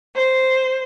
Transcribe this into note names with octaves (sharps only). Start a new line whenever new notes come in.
C5